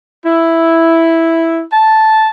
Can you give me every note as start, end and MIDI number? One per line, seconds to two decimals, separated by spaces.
0.24 1.63 64
1.71 2.28 81